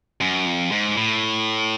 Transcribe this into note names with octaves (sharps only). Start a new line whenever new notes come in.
F#2
F2
G#2
A2